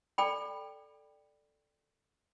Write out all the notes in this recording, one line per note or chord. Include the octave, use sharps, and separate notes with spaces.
A4 D5 G5 B5